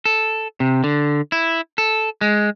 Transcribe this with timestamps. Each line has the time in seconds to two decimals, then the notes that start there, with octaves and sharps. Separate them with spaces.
0.05 A4
0.60 C3
0.84 D3
1.32 E4
1.78 A4
2.21 G#3